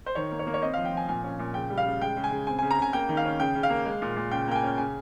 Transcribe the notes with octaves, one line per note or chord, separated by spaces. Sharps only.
C5
D#3 C#5
A#3
C#5
A#3
C#5
C4 D#5
F3 F5
G5
F3 G#5
A#2 G#5
C#4
A#2
C#3 G5
G3
F5
C#3
G#3 G5
C#3
G#5
C#3
C4 G#5
C#3 G#5
A#5
C#3 G#5
A#3 G5
D#3
F5
C#4
C#3 G5
C#3
F5
A#3
G#3
A#2
A#2
C#3 G5
A#3 G5
G#5
C#4
C#3 G#5